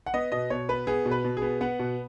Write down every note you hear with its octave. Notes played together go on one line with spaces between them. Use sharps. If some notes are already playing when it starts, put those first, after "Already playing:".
F#5
B3 D#5
B2 D#5
B2 C#5
B3 B4
B3 G#4
B2
B4
B2
G#4
B3
B3 F#5
B2